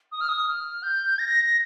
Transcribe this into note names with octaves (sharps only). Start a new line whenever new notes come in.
D#6
F6
D#6
F6
G6
A#6